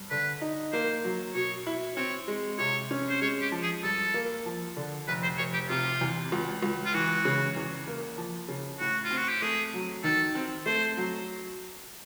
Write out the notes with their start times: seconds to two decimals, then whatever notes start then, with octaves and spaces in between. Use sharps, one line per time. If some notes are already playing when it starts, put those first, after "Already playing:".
Already playing: G2
0.11 D3 B4
0.41 D#4
0.73 A#3 C5
1.04 F#3
1.35 B2 C#5
1.66 E4
1.96 C4 C#5
2.28 G#3
2.58 C3 C#5
2.91 C#4
3.09 C5
3.22 G#3 C#5
3.42 G4
3.52 F3
3.63 G#4
3.83 G2 A4
4.14 A#3
4.46 F3
4.77 D3
5.08 F1 B4
5.23 C5
5.38 F1 C#5
5.53 G4
5.69 C3 F4
6.01 E2
6.32 C#2
6.63 C#2
6.86 F4
6.94 E3 F#4
7.25 C#3
7.56 E2
7.87 A#3
8.18 F3
8.48 C#3
8.80 A2 F#4
9.04 F4
9.11 C4
9.17 F#4
9.29 G4
9.42 A3 G#4
9.74 F#3
10.04 D#3 A4
10.35 C4
10.66 A3 C5
10.97 F#3